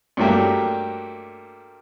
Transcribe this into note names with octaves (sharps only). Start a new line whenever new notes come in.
G2 F#3 A3 A#3 G4